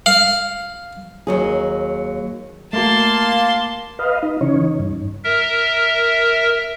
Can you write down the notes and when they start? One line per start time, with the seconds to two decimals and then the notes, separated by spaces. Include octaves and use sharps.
0.06 F5
1.27 D#2 F#3 G#4
2.73 A3 A#3 F#4 A5 C6
3.99 B4 D#5 F5
4.23 D#4
4.41 C#3 E3 C#4 D#4 C#5
4.61 D#4
4.79 G2
5.24 A#4 E5